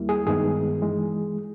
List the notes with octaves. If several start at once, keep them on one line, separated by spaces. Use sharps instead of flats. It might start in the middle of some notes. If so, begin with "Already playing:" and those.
Already playing: D#2 G3 A#3 E4
G#4
G2 D#3 G#3 B3 D#4 G#4
E3 G#3